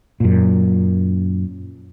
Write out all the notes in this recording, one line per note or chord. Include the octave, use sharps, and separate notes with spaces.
F#2 A#2